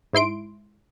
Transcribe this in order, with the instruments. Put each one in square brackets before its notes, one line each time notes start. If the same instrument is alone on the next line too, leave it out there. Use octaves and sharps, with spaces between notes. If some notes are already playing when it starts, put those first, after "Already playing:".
[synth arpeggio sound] G#2 E4 C6 D7